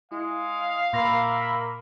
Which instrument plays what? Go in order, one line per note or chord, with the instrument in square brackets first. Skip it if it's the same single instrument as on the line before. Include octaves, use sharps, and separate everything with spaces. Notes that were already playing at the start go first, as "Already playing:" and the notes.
[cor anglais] G#3 [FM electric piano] E4 [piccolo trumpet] F5
[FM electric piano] A#2 C6 A#6 [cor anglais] A#3 [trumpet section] A#4 E5 B5